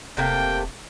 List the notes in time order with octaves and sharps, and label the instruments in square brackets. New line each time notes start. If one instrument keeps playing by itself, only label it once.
[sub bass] E1 [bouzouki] C3 A3 A#3 [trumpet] G5